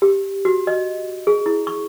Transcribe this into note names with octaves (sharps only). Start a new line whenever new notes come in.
G4
F#4
D#5
G#4
E4
C#6